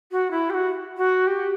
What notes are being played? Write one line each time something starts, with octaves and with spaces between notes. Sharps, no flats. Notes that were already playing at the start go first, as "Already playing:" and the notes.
F#4
E4
G4
F#4
F#4
G4